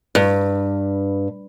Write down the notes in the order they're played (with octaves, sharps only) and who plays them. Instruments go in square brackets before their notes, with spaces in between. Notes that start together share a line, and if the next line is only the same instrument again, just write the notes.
[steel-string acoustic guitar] G2